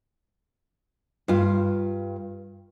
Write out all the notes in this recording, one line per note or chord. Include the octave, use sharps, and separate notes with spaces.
G2 F4